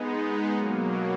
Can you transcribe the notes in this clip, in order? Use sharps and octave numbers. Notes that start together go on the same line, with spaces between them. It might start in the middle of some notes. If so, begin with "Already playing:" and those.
Already playing: G#3 B3 D#4
B2 F#3 A#3